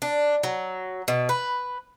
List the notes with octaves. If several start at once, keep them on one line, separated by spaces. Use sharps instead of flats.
D4
F#3
B2
B4